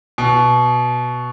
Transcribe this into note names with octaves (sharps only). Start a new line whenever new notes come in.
B2